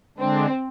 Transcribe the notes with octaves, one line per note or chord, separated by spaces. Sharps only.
D3 G#3 C4 D4